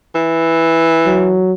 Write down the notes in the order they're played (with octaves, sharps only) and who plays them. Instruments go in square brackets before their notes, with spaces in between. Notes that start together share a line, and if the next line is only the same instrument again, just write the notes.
[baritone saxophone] E3
[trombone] F#3